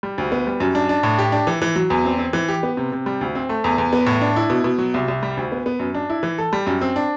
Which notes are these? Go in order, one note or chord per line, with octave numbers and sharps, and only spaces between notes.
G3
D2
B3
G3
F#2
D4
D4
A2
G4
D4
E3
E3
F#3
E2
C4
C4
E3
G4
B3
C3
C3
G3
D2
C4
A3
E2
E2
B3
A2
D4
E4
B2
B2
F#3
C2
C2
G3
D2
B3
B3
F#2
D4
E4
E3
A4
G3
F#2
C4
D4